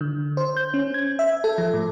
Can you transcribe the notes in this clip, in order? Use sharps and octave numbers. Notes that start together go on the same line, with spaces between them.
D3
C5
G6
C#4
G#6
E5
A4
F3
A2